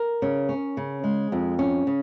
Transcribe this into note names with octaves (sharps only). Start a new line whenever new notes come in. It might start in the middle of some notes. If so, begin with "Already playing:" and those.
Already playing: A#4
C#3
C#4
C#3
G#3
F2
C#4
C#3